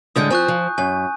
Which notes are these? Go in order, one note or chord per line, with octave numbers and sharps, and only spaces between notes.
A2 D3 G#3 D#6 G6
F3 C4 G#5 C#6 F#6
F3
F#2 G#5